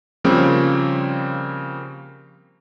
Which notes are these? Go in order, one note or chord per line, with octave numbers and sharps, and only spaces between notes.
C#3 F3 G3 A#3 C4